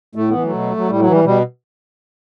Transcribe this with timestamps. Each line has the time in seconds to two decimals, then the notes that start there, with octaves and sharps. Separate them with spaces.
0.15 A2 A3
0.29 E3 B3
0.43 F#3 A3
0.52 B2
0.77 F#3
0.88 A2 G3
0.99 F#3
1.07 E3
1.12 G3
1.24 B2 G3